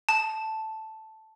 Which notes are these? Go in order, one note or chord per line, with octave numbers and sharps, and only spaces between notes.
A5